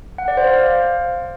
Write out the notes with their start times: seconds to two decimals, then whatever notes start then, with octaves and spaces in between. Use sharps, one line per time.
0.18 F#5
0.28 D5
0.37 C5
0.47 F5